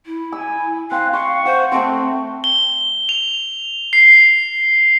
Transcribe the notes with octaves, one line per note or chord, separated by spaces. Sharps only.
E4
G#5 E6
C4 F5 F#6
F5 C6 C#6
C5 F#5
A3 C4 C5
G7
F7
C7